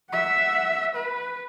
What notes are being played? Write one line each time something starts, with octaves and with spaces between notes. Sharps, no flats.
E5 F#5
B4